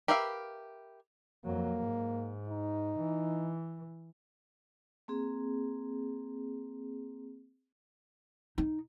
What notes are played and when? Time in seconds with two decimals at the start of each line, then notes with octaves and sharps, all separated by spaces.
0.08 G4 A#4 B4 E5 F5
1.45 F2 F#3 A#3
1.78 G#2
2.49 D#4
2.99 E3
5.08 A#3 C4 G#4
8.58 D#4